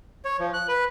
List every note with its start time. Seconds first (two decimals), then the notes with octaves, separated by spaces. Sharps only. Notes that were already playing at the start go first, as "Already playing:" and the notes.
0.25 C#5
0.40 F3
0.54 F#6
0.68 B4